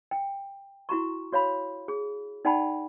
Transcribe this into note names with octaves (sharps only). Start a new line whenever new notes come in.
G5
E4 F#4 A#5 C#6
F#4 C#5 F5 B5
G#4
D#4 D5 F#5 G5 A5 B5